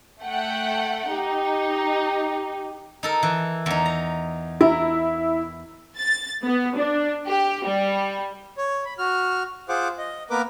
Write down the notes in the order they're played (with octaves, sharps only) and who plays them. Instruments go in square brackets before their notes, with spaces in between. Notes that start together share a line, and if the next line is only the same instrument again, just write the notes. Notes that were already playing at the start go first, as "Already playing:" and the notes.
[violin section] A3 F#5 G5
[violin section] D#4 [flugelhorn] G4
[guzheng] D#4 A4 A#4
E3
E2 D#4
A#5
[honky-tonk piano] E4 [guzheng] A#4
[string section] A6
B3
D4
G4
G3
[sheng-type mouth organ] C#5
B5
F#4 F6
F4 G#4 C5 F#5 D6
D#5
A#3 B3 A#4 B4 D6